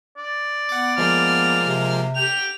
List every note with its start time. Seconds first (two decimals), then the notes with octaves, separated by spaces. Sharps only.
0.17 D5
0.69 B3 F#5 D6
0.98 F3 G#3 A#3 F6
1.63 C3
2.16 G4 G5 F7